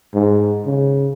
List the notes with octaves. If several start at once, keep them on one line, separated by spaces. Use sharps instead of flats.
G#2
C#3